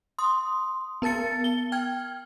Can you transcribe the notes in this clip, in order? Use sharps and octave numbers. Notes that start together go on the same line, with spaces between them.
C6 D#6
B3 A#4 A5 A6 C#7
G7
G5 F6 G#6